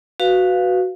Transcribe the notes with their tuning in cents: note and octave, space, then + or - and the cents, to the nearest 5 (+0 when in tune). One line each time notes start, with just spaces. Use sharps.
F#4 +0 B4 +0 F5 +0